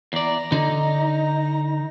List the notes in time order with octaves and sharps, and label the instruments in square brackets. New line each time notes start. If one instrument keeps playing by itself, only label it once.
[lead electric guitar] E2 D5 [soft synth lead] A#5
[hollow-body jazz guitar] D3 [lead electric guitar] D#4